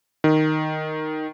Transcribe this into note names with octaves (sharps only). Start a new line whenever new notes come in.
D#3